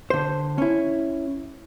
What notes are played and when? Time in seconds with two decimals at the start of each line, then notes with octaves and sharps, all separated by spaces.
0.10 D3 C5
0.58 C#4 E4